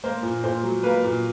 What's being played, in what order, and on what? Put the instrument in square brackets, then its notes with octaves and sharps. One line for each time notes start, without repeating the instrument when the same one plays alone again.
[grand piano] A#3 C5
A#2
A#2 C5
F#3
A#3 B4
A#2